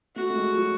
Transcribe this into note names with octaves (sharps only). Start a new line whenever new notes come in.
A3 F#4
A3
G#3
F#3